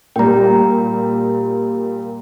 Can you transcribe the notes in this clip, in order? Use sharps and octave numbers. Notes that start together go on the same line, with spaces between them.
A#2 G3 G5 A#5